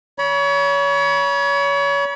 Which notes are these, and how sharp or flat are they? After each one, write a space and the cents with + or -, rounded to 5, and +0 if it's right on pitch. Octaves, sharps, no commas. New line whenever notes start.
C#5 +30 B5 -30